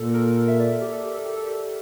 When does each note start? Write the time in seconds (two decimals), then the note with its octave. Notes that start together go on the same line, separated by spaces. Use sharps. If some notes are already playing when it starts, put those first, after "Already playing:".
Already playing: A#2 A4
0.14 A#4
0.37 A4
0.48 E5
0.59 D5
0.81 G4
0.92 A4
1.03 G4
1.15 A4
1.25 G4
1.37 A4
1.47 G4